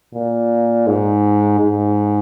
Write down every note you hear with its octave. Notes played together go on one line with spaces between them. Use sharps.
A#2
G#2
G#2